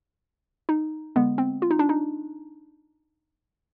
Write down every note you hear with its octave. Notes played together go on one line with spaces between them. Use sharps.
D#4
D3 G#3 B3
C4
F4
D#4
D4
D#4